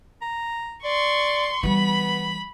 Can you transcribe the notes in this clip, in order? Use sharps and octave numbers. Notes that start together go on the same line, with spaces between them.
A#5
D5 C6 C#6
E3 G3 B3 B5